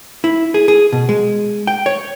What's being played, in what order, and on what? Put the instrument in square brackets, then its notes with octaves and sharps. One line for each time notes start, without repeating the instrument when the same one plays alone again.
[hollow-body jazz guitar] E4
G#4
G#4
B2
G#3
G5
C#5